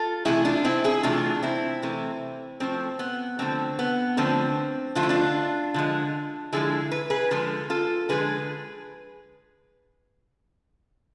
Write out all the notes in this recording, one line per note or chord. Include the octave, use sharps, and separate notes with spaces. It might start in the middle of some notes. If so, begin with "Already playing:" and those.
Already playing: F4 A4
C3 E3 A3 E4 G#4
D4 F4
C4 E4
E4 G#4
C3 E3 A3 D4 F4
C4 E4
C3 E3 A3
D3 F3 A3 C4
B3
D3 F3 A3 C4
B3
D3 F3 A3 C4
D3 F3 A3 F4
E4
D4 F4
D3 F3 G#3
D3 F3 G#3 E4 G#4
B4
G#4 B4
D3 F3 G#3 F4 A4
F4 A4
D3 F3 G#3 G#4 B4